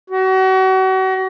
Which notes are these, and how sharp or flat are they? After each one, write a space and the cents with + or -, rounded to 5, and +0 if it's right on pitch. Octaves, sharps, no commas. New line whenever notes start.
F#4 +35